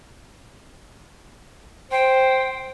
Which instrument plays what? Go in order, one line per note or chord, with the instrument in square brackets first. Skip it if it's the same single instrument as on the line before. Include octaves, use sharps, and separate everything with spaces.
[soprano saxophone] C5 [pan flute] G5